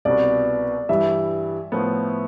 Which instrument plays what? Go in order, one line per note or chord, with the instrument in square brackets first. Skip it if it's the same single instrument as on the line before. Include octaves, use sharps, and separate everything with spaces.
[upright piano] C2 B2 B3 [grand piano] D5
[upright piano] G2 E3 G3 [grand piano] E5
[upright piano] A2 F3 B3